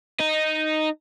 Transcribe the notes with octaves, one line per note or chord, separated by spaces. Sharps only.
D#4